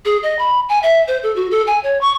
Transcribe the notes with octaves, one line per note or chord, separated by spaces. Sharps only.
G#4
D#5
B5
G#5
E5
C5
A4
F#4
A4
G#5
C#5
C#6